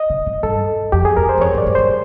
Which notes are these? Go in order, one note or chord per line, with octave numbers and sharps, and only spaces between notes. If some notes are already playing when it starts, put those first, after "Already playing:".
Already playing: D#5
C#3
C3
G2 A4
F2 G4
G#4
E2 A#4
C5
F#2
F2 C#5
F#2
D5
G#2
G2 C5